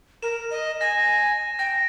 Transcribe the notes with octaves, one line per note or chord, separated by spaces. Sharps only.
A#4 E7
D#5
G#5 A#6
G5 A#6